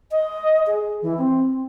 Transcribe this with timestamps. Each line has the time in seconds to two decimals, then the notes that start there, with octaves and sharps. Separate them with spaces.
0.11 D#5
0.67 G#4
1.02 E3
1.18 C4